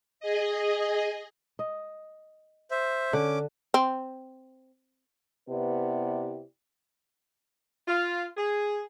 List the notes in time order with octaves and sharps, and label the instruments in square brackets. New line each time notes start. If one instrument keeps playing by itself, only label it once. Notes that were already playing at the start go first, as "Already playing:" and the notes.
[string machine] G#4 D#5
[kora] D#5
[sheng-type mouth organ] C5 E5
[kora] D3 [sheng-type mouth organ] C#4 D6
[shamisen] C4
[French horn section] C3 B3 E4 G4 B4 D5
[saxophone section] F4
G#4